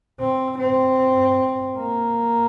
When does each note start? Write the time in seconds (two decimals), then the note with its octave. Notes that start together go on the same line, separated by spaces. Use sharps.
0.20 C4
0.58 C4
1.77 A#3